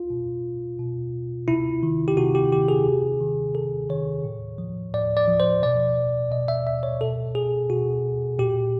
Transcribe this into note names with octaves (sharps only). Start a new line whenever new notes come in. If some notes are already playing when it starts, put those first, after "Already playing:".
Already playing: F4
B2
B2
C3 E4
D#3
G4
C3 F#4
G4
D#3 G4
G#4
C3
D#3
C3 A4
D#3 C#5
A2
F3
A2 D5
D5
F3
C5
B2 D5
B2 D#5
E5
E5
C#5
B2 A4
G#4
B2 F#4
A#2 G4